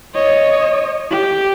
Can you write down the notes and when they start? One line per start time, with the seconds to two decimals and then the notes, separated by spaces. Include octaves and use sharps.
0.15 C#5 D#5
1.11 G4